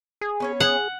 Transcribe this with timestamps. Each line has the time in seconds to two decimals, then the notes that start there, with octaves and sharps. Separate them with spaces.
0.21 G#4
0.40 B3 C#4 C#5
0.60 G#4 F#5